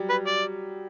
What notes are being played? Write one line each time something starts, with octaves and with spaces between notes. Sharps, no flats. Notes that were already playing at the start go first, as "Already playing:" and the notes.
Already playing: F#3 G3
B4
D5